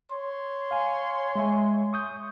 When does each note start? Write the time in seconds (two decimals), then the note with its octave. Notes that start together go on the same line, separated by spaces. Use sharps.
0.11 C#5 C6
0.71 F5 G#5
1.36 G#3 E5 G#5
1.93 C#6 D#6 G6